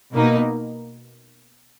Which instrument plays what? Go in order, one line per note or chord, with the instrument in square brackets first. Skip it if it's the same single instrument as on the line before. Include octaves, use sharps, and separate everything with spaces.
[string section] B2 A#3 D#4